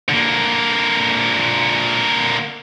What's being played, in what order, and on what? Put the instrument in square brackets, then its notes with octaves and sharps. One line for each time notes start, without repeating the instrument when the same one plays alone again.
[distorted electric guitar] D3 A#3